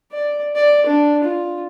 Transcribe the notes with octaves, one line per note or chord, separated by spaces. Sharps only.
D5
D5
D4
F4